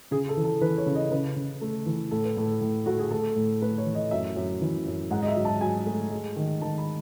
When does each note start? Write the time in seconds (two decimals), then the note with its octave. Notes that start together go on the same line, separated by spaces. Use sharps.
0.11 C#3 G#4
0.29 A4
0.37 E3
0.44 A4
0.61 E3 B4
0.78 C#5
0.86 C#3
0.95 D#5
1.11 C#3 B4
1.36 C#3
1.61 A3
1.86 E3
2.11 A2 A4
2.25 B4
2.37 A2 A4
2.61 A2
2.86 A3 F#4
2.99 G#4
3.11 A3 A4
3.36 A2
3.62 A3 B4
3.78 C#5
3.86 E3
3.95 D#5
4.11 F#2 E5
4.36 F#2
4.61 E3
4.86 F#2
5.11 G#2 F#5
5.22 D#5
5.28 E5
5.36 F#3
5.45 A5
5.61 F#3 G#5
5.86 A3
6.12 G#3
6.36 D#3
6.61 D#3 A5
6.78 B5